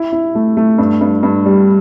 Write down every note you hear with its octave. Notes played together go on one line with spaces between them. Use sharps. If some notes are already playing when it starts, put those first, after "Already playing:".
Already playing: E4
E4
A3
A3
G2
G2
G2
G3